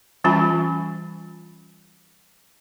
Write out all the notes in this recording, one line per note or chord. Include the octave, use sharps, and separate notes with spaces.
E3 G3 C#4 F4 G#5 B5